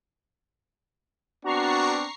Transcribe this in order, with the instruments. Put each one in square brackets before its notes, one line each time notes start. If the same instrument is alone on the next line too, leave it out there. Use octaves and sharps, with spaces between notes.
[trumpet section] B3 C4 D4 [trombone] F#4 [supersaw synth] A#5 C#6 C7